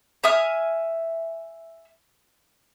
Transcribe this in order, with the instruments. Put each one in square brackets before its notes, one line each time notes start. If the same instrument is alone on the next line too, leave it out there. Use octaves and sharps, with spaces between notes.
[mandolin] E5 G#5 D#6 F6